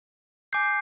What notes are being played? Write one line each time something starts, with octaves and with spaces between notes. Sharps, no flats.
G#5 D6 G6 C7